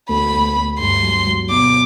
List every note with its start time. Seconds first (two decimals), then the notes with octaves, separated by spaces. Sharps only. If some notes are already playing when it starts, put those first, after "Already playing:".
0.09 D2 B5
0.33 D2
0.57 D2
0.79 G2 C6
1.03 F#3
1.27 F#3
1.50 B2 D6